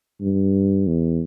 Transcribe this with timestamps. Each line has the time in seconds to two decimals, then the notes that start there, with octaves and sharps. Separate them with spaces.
0.21 G2
0.87 E2